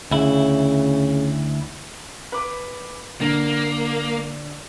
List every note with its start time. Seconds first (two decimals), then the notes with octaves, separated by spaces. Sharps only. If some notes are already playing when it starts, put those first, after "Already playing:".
0.11 D2 C#3 E4
2.32 B4 D6
3.21 D3 A#3